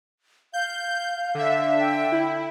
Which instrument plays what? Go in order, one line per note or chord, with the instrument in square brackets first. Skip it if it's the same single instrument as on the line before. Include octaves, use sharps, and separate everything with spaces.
[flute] F5 [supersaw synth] G6
[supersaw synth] D3 E5
[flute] G5
[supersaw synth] E4